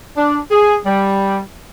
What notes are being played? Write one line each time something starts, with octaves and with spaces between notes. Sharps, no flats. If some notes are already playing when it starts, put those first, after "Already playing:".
D4
G#4
G3